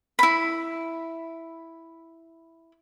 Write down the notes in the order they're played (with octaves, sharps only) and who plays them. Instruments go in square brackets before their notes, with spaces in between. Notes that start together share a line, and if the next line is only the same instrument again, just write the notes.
[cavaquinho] E4 B5